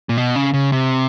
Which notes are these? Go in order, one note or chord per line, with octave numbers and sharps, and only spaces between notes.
A#2
B2
C#3
C#3
C3